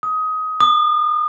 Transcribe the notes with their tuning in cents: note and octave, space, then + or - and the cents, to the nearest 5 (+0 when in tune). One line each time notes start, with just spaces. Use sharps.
D#6 +20
D#6 -40